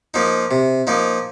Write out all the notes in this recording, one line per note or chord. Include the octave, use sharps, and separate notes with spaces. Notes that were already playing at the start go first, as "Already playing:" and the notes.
F3 A#3 D#4
C3
F3 A#3 D#4